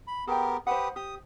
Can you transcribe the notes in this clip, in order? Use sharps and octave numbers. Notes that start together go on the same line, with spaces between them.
B5
B3 G4 G#4 A#4 G5
G4 B4 C5 F#5 D#6
G4 D#6